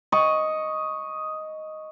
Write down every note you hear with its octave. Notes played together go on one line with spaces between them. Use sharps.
D#5 C#6